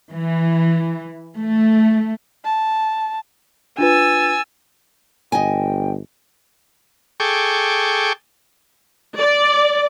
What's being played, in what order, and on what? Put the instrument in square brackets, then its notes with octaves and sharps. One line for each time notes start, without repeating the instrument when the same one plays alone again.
[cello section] E3
A3
[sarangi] A5
[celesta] D4 F4 B4 [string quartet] G#5 E6 A6
[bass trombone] G1 [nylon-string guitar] D#5 G#5 [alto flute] G5
[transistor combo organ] G#4 A4 G5 C#6 D6
[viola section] D5